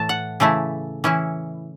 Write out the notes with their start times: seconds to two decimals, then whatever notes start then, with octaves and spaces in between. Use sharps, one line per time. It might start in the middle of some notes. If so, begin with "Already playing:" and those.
Already playing: A2 E3 A3 A5
0.09 F#5
0.40 C#3 E3 A3 E4
1.04 E3 C#4 E4